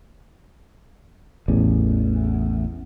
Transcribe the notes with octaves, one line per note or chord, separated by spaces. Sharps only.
A1 E2